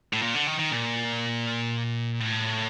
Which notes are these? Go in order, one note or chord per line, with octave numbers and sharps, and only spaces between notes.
A2
A#2
D3
D#3
D#3
A#2
A2